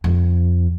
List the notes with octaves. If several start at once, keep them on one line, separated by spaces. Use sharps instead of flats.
F2